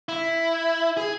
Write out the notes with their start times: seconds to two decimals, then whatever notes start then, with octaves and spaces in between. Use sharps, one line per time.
0.09 E4
0.97 G#4